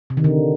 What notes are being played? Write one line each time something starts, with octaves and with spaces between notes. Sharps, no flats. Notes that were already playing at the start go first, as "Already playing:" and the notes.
C3
D#3
D3